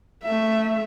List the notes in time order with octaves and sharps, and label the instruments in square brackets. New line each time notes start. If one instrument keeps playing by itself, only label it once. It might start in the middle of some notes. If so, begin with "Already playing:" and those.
[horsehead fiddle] A3 E5